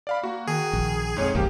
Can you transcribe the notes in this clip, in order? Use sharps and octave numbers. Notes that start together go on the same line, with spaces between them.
D5 F5 B5
A#3 F#4
D#3 G#4
A#1
F2 G#2 C#5
D#1 G#1 C#2 F3 A#3 G4